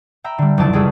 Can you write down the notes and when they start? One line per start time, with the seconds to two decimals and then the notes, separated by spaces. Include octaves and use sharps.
0.24 E5 G5 A#5 B5
0.38 D3 G3
0.58 F#1 C2 F2 F#3 A5 D7
0.73 F#1 C#2 G3 G#4 A4 B4